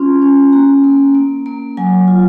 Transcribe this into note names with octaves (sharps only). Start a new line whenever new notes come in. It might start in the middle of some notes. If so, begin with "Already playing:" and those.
Already playing: C#4 F4 C6
C#4
A#3 A#5
A#3
A#3
A#3
F#3 G#5
F4